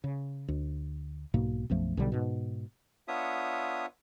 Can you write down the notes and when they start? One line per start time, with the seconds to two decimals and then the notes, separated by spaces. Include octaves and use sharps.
0.04 C#3
0.48 D2
1.34 B1 G#2 B2 A#3
1.70 B1 F#2 F3 A3
1.97 B1 B2 D3 G3
2.12 G#2 B2
3.08 B3 D4 F4 C#5 E5 D#6